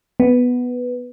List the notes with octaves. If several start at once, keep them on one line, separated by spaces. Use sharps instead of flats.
B3